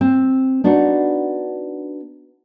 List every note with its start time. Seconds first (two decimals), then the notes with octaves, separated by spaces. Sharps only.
0.01 C4
0.64 B3 D4 D#4 F#4